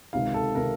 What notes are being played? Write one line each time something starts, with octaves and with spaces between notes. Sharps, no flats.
C#2 C3 D#3 F5
A4
C3 D#3 A#4